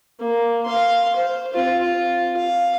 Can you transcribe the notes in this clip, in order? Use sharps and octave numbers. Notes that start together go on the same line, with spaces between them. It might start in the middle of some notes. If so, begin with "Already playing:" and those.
A#3
F5 C6
C5
C4 F4
F4
F5